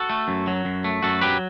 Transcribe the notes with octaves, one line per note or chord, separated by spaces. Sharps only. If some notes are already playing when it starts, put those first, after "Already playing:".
Already playing: F#4 A4
A3
F#2
F#3
F#2
A3
F#2 F#4 A4
F#3 G4 B4